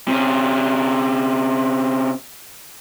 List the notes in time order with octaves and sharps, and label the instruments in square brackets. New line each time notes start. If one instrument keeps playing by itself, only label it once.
[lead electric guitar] C3 C#4